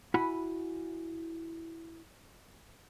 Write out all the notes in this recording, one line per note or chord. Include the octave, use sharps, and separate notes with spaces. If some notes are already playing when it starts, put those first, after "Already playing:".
E4 F#4 F#5 G#5 B5